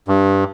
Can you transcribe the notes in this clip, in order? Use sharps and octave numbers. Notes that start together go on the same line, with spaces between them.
G2